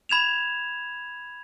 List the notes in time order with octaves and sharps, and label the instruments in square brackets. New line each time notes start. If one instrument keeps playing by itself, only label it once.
[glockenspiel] B5 G#6 E7 F7